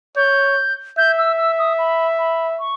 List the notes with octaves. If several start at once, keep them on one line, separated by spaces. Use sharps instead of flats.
C#5 G6
E5 G6
E6
E6
D#6
B5
B5
C#6